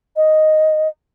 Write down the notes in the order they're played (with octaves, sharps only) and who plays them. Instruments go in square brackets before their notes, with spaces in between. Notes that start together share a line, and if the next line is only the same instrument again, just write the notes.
[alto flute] D#5